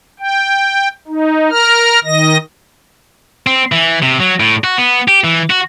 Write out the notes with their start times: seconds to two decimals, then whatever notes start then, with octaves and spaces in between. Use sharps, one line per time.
0.20 G5
1.07 D#4
1.50 A#4 A#5 F6
2.04 D#3 D#5 A#6
3.47 C4
3.72 E3
4.02 C3
4.20 F#3
4.40 A2
4.64 F#4
4.78 B3
5.08 G4
5.24 E3
5.50 F#4